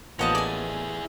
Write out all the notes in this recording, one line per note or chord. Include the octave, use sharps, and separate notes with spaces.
A1 F3 A#3 B3 C#5 D#5 A5
E4 G#4 D5 G#5